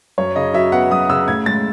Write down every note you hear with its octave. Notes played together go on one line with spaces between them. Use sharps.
F#2 C#5
C#3 D#5
F#3 E5
B3 F#5
F#2 D#6
C#3 E6
A2 G#6
G#3 A6